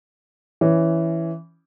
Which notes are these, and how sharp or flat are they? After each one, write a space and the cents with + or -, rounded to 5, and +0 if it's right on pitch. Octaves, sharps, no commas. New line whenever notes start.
E3 +0 C#4 +0